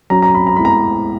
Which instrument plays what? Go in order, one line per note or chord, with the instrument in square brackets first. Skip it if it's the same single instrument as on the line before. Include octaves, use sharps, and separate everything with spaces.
[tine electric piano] F#3 C#4 F#4 [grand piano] A#5
[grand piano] A#5
B5
A#5
[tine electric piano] G#3 B3 E4 [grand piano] B5
[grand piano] A#5